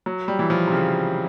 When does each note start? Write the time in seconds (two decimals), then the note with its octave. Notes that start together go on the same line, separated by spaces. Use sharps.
0.06 F#3
0.28 G3
0.39 E3
0.50 F3
0.67 C3
0.72 C#3